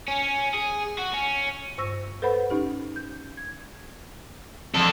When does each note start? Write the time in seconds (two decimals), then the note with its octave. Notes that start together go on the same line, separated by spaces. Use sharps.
0.08 C#4
0.54 G#4
0.98 F#4
1.13 C#4
1.78 G2 C5 C#6 E6 A#6
2.22 A4 B4 C5 F#5 B5
2.50 C#4 D#4 G4
2.96 G6
3.37 G#6
4.74 F2 D4 A4